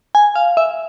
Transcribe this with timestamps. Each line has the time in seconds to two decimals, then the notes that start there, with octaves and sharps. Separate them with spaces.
0.15 G#5
0.35 F5
0.57 E5